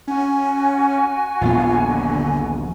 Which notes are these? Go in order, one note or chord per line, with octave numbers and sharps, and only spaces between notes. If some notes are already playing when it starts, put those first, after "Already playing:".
C#4 F#4 G#5
D#1 A#1 B3 F4
D3